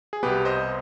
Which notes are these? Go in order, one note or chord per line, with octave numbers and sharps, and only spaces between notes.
G#4
C2 B2 B3 G4 B4
C5 D#5